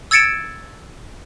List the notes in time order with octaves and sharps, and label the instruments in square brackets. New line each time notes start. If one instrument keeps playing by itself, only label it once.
[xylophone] E6 G#6 A6 C#7 D7 E7